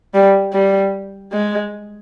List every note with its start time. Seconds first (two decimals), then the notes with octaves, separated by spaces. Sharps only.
0.14 G3
0.53 G3
1.32 G#3